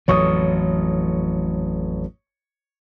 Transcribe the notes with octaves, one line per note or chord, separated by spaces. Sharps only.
A1 F2 A2 E3 F#3 C#5 C#6 D#6